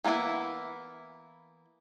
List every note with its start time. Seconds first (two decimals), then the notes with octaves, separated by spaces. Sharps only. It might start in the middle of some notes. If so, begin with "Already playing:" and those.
0.04 E3 A#3 B3 D4 E4